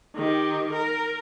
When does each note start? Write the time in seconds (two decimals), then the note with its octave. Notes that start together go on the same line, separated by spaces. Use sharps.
0.16 D#3 G4
0.73 A#4